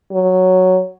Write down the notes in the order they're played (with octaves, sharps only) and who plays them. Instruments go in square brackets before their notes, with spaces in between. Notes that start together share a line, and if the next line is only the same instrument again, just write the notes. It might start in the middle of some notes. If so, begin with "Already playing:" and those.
[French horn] F#3